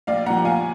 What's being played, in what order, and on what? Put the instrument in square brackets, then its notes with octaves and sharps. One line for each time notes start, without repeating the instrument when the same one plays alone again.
[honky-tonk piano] A#1 D5 F5
A#2 F3 F#5 A#5
D#2 F5 G#5